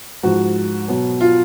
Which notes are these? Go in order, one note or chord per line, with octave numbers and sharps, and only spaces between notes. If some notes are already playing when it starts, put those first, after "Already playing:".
G#2 F3 F#4
B2 F#3
F4